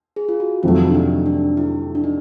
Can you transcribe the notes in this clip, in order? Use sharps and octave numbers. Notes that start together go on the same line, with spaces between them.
G#4
F4
F#4
F2 C3 D#3 F#3 A3 F4
D4
D#4
D4
E4
D4
D#4